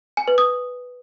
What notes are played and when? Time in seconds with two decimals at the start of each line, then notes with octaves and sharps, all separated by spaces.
0.17 G#5
0.28 B4
0.38 D#6